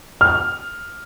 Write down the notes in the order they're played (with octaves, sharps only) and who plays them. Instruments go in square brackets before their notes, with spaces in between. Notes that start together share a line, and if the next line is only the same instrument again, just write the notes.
[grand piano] F6